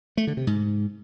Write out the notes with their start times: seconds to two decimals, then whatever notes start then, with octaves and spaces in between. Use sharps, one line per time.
0.17 A3
0.27 D3
0.37 C3
0.47 G#2